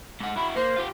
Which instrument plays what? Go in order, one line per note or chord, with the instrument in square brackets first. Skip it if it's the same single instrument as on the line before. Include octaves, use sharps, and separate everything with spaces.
[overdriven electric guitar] G#2 F#5
[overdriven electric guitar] E4 F#4 [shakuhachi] B5
[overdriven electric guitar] A#3 [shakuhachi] C5
[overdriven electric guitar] F4 G4